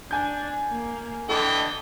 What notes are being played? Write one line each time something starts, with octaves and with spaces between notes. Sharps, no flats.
D4 G#5 G6
A#3
D3 E3 A4 D#5 G5